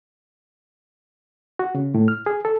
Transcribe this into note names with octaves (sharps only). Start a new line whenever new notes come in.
F#4
C#3
A2
F6
G#4
A4